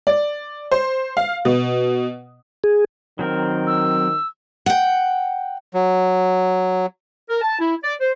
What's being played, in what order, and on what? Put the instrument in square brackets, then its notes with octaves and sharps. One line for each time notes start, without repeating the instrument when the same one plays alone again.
[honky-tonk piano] D5
C5
F5
B2
[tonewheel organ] G#4
[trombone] D#3 [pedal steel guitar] F#3 C4 A#4
[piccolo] E6
[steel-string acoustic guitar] F#5 G5
[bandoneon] F#3
[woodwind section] A#4
A5
E4
D5
C5